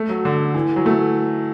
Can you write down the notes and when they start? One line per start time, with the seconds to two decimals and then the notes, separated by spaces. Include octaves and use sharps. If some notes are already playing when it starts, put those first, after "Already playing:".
Already playing: A3
0.09 F#3
0.25 D3
0.54 E3
0.76 F#3
0.86 A3